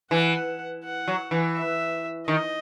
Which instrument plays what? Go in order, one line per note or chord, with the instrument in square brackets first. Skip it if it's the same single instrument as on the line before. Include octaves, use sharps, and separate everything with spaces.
[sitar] E3 [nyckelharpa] F#5
[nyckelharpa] F#5
[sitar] F#3
E3
[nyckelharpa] E5
[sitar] D#3 [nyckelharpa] D#5